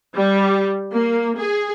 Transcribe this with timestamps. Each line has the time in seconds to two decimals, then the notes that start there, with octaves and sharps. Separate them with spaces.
0.14 G3
0.93 A#3
1.38 G#4